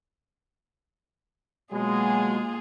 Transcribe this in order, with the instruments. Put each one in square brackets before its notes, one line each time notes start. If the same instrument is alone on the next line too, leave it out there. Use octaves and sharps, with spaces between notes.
[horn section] B2 F#3 G#3 [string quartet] A#3 F4 G#4